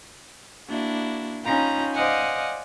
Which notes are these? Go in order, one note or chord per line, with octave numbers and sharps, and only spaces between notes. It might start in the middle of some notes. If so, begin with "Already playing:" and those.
A#3 D4 E4 F#4
C#4 D#4 F4 G5 A#5 B5
C5 D5 D#5 F5 F#5 G#5